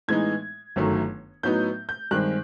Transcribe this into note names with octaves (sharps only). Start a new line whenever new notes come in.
A2 E3 G#3 B3 D#4 G#6
G1 F#2 D#3 F#3 A3
A2 F#3 B3 D#4 G6
G6
G2 D#3 G#3 C4 F#6